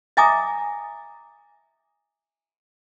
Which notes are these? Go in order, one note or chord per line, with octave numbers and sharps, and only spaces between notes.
D#5 E5 G#5 A#5 D6 D#6